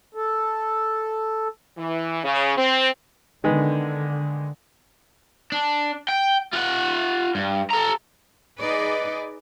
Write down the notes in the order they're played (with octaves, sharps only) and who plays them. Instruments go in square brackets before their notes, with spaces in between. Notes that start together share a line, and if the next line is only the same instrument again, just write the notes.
[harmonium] A4
[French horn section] E3
C#3
C4
[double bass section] D3 [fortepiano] D#3 G#3 B3
[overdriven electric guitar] D4
G5
F4 F#5
G2
A4 A#5
[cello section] D#4 G#4 B4 D5 D#5